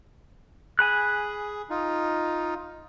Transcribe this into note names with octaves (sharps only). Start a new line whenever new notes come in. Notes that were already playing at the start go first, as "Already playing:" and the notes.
G#4 G#5 B5 F#6
D#4 F4